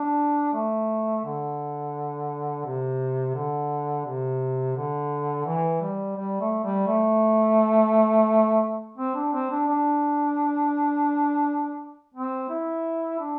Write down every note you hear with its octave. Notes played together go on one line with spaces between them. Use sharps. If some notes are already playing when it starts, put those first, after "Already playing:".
Already playing: D4
A3
D3
C3
D3
C3
D3
E3
G3
G3
A3
G3
A3
C4
D4
C4
D4
D4
C4
E4
D4